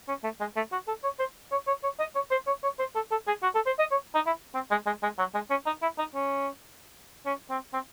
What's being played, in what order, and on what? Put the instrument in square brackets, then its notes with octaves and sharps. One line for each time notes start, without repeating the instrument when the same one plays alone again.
[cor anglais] C#4
A3
G#3
A3
F#4
A4
C#5
C5
C#5
C#5
C#5
D#5
C#5
C5
C#5
C#5
C5
A4
A4
G#4
F#4
A4
C5
D#5
C#5
D#4
E4
C4
G#3
G#3
G#3
F#3
G#3
C#4
D#4
E4
D#4
C#4
C#4
C4
C4